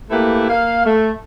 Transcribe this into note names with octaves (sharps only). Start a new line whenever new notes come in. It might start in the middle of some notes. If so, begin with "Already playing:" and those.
A3 A#3 E4 G4 B4
A#3 F5
A3